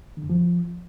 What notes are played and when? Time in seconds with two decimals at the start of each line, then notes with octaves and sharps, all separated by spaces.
0.17 D3
0.23 F#2
0.30 F3